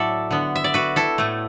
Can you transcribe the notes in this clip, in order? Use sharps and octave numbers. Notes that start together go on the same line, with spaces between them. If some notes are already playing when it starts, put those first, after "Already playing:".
Already playing: A2 F#3 E4 F#4 A4 D5 E5
D3 B3
E5
D5
F#4 B4
E4 A4
A2 A3